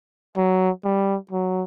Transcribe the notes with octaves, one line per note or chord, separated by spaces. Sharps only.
F#3
G3
F#3